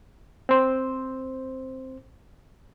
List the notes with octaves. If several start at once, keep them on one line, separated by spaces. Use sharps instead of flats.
C4 C5